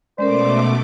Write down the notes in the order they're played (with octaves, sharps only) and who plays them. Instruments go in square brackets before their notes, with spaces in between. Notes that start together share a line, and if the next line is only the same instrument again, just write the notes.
[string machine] B2 A3 D6 [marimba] G#3 C#4 A#4 [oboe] C5 [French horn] D5